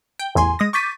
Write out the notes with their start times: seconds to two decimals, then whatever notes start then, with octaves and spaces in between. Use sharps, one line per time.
0.19 G5
0.35 A1 E2 G#5 C6
0.59 G#3 D#6 A#6
0.73 C#6 D6 G6 A6 B6 D#7